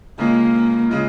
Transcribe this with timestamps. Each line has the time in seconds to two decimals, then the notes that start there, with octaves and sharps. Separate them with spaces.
0.19 C#3 G#3 A#3 F4
0.89 C#3 G#3 F4